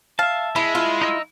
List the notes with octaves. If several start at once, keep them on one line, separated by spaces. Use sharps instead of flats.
E5 F5 A5
G#3 E4 B5
E4 F4
D#4 D#5 E6